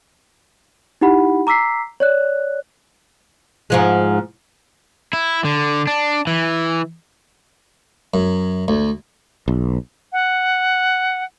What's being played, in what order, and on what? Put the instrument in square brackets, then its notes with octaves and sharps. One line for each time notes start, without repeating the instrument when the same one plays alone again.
[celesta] D#4 E4 G4 F#5 B5
A#5 D6 E6 B6 C7
C#5 D5 F#6
[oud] G#2 F3 G#3
[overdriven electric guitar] E4
D3
D4
E3
[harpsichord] F#2
D2
[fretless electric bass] B1
[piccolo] F#5